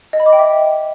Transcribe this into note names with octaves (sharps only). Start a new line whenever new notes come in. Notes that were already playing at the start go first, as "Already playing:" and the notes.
D#5
B5
D6
G5
E5